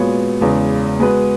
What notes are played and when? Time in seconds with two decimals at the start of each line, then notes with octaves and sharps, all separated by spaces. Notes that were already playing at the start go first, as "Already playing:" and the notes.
Already playing: A#2 G#3 B3 F#4 C#5
0.41 E2 C#3 G#3
1.00 G#3 B3 F#4 B4